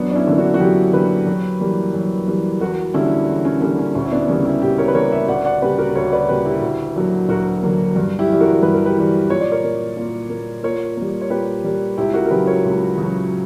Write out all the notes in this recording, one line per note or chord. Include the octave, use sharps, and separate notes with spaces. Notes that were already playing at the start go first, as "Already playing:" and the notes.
Already playing: F#2 B3 D4
D4
C#4 E4
D3 A#3
D4 F#4
F#4
F#2 E4 G4
D3 A#3 G4 B4
F#2
E3 G3 A#3
F#2
E3 G3 A#3
E2 F#4 A#4
D3 G3 A#3 C#4 E4
E2
C#4
D3 G3 A#3 C#4
C#4
D2 C#4
E4
B3 D4
C#3 G3 A#3 C#4 E4
E4 G4
D2 E4 G4
A#4 C#5
B4
C#3 G3 A#3 A#4 C#5
C#5 E5
D2 D5 F#5
D5 F#5
C#3 G3 A#3 G4 B4
F#4 A#4
D2 A#4 C#5
B4 D5
C#3 G3 A#3 G4 B4
E4 G4
D2
D3 F#3 A#3
D2 F#4 A#4
D3 F#3 A#3
G2
E4 G4
E3 G3
F#4 A#4
G2 B4
A#4
G4 B4
E3 G3
A#2 C#5
D5
A#4 C#5
A#3
A#2
A#3
A#2 A#4 C#5
G3 A#3
C#5
A#2 G4 B4
G3 A#3
C#2 E4 G4
F#4 A#4
A#4
C#3 F#3 G4 B4
A#4 C#5
C#2
C#3 F#3